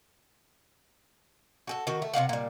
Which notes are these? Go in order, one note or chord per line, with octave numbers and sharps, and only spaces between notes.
F#4 G#4 A4
D#3 F#4
A3
C3 D4 F5 F#5
A#2 G3